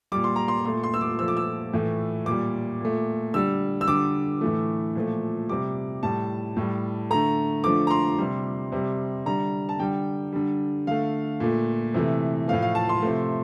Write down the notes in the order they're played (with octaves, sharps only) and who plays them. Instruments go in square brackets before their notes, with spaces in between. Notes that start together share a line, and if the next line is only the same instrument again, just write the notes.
[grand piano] A#2 G3 D6
C6
A#5
C6
A#2 A3 C6
C6
E6
D6
A#2 F3 A3 E6
D6
E6
A2 E3 A3
A#2 G3 D6
A#2 A3
D3 G3 E6
E6
D3 G3 D6
A2 E3 A3
A#2 F3 A3
C3 G3 D6
A2 G3 A5
A2 G3
D3 A3 A#5
D3 F3 A3 D6
A#5
C6
C3 G3
C3 G3
D3 G3 A#5
A5
D3 G3 G5
D3 G3
D3 A3 F5
A#2 A3
C3 E3 A3
A2 F3 A3 F5
F5
A5
C6
C3 F3 A3